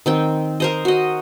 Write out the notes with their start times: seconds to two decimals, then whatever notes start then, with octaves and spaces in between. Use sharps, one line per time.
0.06 D#3 C4 G5
0.60 A#4 C5 D#5
0.85 F#4 D#5